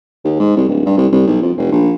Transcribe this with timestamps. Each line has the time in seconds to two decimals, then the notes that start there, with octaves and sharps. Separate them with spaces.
0.25 D#2
0.40 G#2
0.57 C2
0.69 D1
0.86 G2
0.97 C2
1.12 C2
1.27 B1
1.42 F2
1.57 F1
1.72 A#1